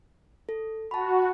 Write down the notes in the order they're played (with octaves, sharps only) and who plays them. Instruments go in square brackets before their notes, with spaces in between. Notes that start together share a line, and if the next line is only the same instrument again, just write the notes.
[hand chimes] A4
[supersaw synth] F#4 [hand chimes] A5 B5